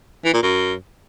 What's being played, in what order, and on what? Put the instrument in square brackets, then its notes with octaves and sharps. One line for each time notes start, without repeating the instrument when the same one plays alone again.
[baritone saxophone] E3
A#2
F#2